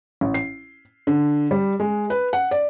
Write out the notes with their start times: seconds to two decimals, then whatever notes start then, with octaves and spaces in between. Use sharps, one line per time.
0.21 A1
0.34 C7
1.07 D3
1.51 G3
1.80 G#3
2.10 B4
2.33 F#5
2.51 D5